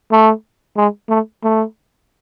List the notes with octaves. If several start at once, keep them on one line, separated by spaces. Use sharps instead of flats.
A3
G#3
A3
A3